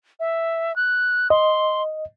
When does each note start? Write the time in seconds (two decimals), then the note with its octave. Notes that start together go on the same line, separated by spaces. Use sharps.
0.20 E5
0.76 F#6
1.30 D#5 C6